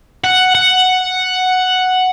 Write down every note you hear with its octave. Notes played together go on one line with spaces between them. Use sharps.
F#5
F#5